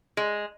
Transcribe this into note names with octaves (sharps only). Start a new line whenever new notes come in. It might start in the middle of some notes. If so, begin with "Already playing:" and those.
G#3